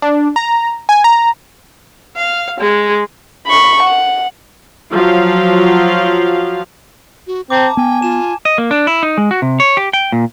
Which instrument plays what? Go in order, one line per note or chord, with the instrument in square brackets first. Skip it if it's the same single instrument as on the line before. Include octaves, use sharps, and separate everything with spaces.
[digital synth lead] D4
A#5
G#5
A#5
[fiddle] F5
G#3
[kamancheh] B5 C#6
F#5
[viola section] F3 F#3 F5
[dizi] F#4
[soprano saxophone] C4 [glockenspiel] A5 D6 [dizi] A#5
[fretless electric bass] B3 [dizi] G5 [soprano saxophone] G#5
[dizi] F4 [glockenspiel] E7
[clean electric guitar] D#5
A#3
D4
E4
D#4
G#3
F#4
C3
C#5
G4
G5
A#2